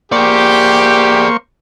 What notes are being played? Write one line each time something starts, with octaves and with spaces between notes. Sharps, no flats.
A#3 G4 G#4 C5 D5 C#6